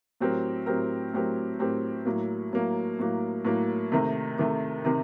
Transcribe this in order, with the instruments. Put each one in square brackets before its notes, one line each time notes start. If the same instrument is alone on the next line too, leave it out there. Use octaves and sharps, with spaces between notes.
[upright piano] A2 F#3 C4 G4 A#4
A2 F#3 C4 G4 A#4
A2 F#3 C4 G4 A#4
A2 F#3 C4 G4 A#4
A2 F#3 A#3
A2 F#3 A#3
A2 F#3 A#3
A2 F#3 A#3
C3 D#3 A3
C3 D#3 A3
C3 D#3